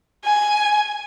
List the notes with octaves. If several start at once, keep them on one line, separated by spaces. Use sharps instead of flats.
G#5